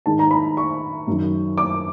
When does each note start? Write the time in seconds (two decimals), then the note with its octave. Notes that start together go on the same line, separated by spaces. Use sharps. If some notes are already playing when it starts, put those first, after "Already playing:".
0.06 G#2 D#3 A5
0.19 A#5
0.31 B5
0.57 C#6
1.08 F#2 D#3
1.58 D6